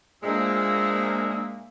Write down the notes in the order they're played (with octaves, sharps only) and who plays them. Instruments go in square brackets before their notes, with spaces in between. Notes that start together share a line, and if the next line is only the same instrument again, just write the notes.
[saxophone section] A#2 G#3 [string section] A#3 [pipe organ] D4 E5 [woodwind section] C5 E6